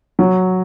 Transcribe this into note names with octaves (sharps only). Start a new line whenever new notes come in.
F#3